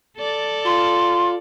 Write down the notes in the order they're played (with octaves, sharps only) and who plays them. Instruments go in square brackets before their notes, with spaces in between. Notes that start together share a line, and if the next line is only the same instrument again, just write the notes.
[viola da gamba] A4 D5
[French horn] F4 [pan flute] C6